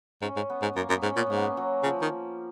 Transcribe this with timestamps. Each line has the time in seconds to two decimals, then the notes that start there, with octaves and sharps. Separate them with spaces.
0.22 G#2 C#4
0.36 G#2
0.50 B3
0.62 G#2
0.76 F#2 A#3
0.89 F#2 B3
1.03 G#2 C#4
1.16 A#2 B3
1.30 G#2 A#3
1.37 B3
1.47 A#3
1.57 F#3
1.83 C#3 F3
2.02 D#3